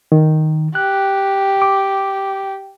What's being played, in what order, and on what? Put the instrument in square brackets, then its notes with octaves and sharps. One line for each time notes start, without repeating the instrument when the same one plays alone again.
[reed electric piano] D#3
[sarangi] G4 [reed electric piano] F#6
[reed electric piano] D6